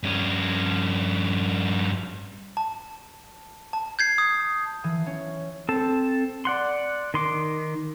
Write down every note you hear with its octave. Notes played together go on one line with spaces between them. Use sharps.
G2 C#4
A5
A5
G6 G#6 C7
D#6
E3
C#4
C4 A4 A5
D5 F#5 C6
D#3 C6 D6